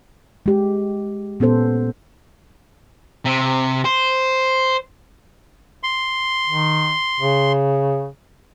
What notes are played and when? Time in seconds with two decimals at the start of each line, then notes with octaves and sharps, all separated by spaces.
0.46 G#3 G4
1.40 A#2 B3 C#4 A4 C5
3.25 C3
3.85 C5
5.83 C6
6.47 D#3
7.20 C#3